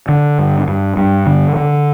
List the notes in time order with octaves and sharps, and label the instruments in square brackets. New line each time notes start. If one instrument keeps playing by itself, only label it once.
[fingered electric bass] D3
G2
G2
G2
D3
D3